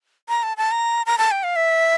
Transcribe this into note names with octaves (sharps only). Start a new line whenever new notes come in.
A#5
A5
A5
A#5
A#5
A5
G5
F5
E5